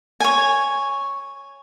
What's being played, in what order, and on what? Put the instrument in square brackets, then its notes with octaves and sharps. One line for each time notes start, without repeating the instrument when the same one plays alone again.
[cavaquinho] C#5 G#5